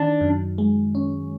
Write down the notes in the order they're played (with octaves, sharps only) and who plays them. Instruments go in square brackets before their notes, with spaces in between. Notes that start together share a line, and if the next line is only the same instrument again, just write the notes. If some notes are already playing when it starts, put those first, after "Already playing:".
Already playing: [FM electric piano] D#3 [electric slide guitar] D4
[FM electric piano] F#2
G#3
C#4